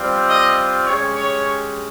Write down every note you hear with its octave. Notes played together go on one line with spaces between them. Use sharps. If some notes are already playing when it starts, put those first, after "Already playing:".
Already playing: G3 C4 F4
D#5
G#3 C#4 G4 C#5
C#5